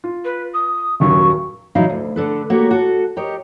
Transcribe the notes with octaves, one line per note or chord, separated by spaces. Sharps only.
F4
B4
D#6
D#1 F#2 F#3 C#6
A#2 E3 F#3 D#4 E4 F5
D2
D3 A4 B4
A#3 F#4 G4 C#5
F#4 A4
G4 A#4 C#5 D#5